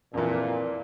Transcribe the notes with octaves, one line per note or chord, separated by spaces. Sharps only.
F2 A#2 E3